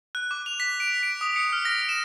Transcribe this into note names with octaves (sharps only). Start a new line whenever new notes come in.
F#6
D6
F7
B6
D7
D7
D#6
C#7
F6
A#6
E7